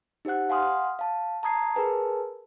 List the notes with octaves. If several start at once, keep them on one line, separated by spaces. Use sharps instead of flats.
D#4 G4 C5 F#5 F#6
F5 F#5 G#5 C6 D#6 F6
F5 A5
A5 A#5 D#6 G#6 C7
G#4 A#4 B4 G#5 A5